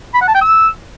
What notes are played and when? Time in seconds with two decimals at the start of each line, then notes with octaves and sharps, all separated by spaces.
0.14 B5
0.21 F#5
0.28 A5
0.35 G5
0.41 E6